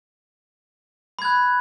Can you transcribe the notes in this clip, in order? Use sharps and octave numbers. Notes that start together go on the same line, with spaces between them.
B5 F#6 G#6